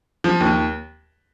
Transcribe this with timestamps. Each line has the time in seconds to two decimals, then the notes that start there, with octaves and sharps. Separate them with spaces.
0.24 F3
0.41 D#2